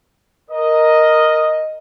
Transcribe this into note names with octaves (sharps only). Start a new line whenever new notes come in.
A#4 D#5